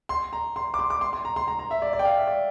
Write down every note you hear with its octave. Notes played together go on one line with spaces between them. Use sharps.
C6
A#5
C6
D6
C6
D6
C6
C6
A#5
C6
A#5
A#5
E5
D5
D5
G5
F5
E5
D5